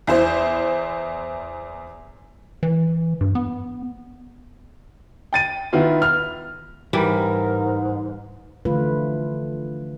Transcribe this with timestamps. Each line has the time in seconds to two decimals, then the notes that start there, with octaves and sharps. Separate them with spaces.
0.07 E2 E4 C5
2.63 E3
3.21 G2
3.35 B3
5.33 G5 A6 D#7
5.73 D#3 B3 E4 F4
6.02 F6
6.93 G#2 E3 G3 A#4
8.65 D3 E3 F3 A3 F4 B4